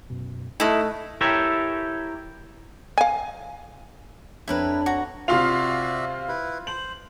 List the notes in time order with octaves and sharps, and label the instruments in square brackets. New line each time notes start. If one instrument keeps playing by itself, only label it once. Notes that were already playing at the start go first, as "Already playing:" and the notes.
[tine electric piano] F#2 B2
[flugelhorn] A3 [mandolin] D#4 E4 [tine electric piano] D#5 F6 F#6
[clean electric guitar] E4 G4 A4 A#4 C#5
[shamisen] F5 G#5
[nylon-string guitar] F2 C4 [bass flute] D4 [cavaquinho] E4 A#4 B4 [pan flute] C#5
[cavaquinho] F#4 A#5
[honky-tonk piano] C3 F5 F7 [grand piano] F4 C6 [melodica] F#4 D5 E5
[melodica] E4 B4
[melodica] C5 [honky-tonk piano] F#7